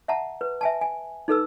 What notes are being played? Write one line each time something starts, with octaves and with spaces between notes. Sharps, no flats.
E5 F#5 A5 A#5
B4
E5 G#5 A5
G#5
D#4 A4 B4 E6